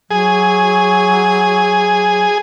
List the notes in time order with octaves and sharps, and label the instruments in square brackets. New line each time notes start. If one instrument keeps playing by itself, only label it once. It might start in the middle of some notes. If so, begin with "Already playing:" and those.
[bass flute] F#3 [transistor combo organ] G#4